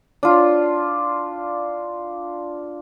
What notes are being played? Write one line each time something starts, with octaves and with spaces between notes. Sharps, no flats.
D4 F4